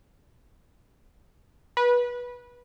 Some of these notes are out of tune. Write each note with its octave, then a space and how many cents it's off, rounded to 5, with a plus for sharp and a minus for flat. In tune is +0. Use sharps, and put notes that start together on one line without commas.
B4 -20